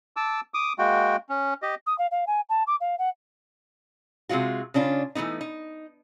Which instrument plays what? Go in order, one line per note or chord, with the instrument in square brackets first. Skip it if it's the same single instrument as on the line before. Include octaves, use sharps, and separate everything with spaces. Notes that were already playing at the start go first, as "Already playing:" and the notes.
[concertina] A5 D6 E6
D6 D#6
G#3 A#3 F#4 G5
C#4
G4 D#5
[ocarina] D#6
F5
F5
G#5
A5
D6
F5
F#5
[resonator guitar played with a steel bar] C3 D#3 G#3 F4 F#4
C#3 C#4 D4 F4
E3 F3 A3 B3 D#4
D#4